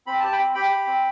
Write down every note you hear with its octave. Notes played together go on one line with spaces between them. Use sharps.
C4 B5
G4 A5
G5 B5
C4
G4 G5 B5
G4
C4